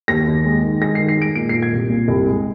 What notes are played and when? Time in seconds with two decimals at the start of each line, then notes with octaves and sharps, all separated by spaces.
0.08 D#2 A#6
0.27 D#2
0.45 G#3
0.63 D#3
0.81 G#3 A#6
0.95 D#3 C7
1.09 C7
1.17 G#3 D7
1.35 A#2 D7
1.49 A#2 C7
1.63 G#6
1.72 C2
1.89 A#2
2.08 C2
2.27 G#3